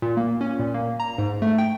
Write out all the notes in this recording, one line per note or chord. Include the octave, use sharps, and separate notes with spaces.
A#2
A#3
C#4
A#2
A#3
A#5
G#2
A3
G5